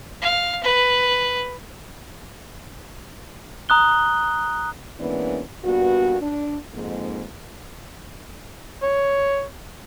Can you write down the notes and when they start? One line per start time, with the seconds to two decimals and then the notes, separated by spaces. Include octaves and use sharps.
0.22 F5
0.63 B4
3.69 A#5 D#6 F#6 G7
5.00 E3 G#3 A#3 B3 C#4 D4
5.65 G2 A#2 B3 F#4
6.22 D4
6.74 F2 G#2 A#3
8.82 C#5